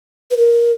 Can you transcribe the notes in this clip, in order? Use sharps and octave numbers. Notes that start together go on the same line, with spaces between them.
B4
A#4